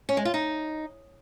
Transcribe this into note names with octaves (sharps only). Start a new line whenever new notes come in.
C#4
G#3
F4
D#4